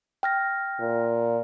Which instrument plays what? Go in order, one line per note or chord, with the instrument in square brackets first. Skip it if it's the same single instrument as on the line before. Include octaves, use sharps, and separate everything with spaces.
[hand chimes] G5 F6 A#6
[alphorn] A#2